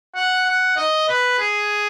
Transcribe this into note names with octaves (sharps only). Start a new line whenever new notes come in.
F#5
F#5
D#5
B4
G#4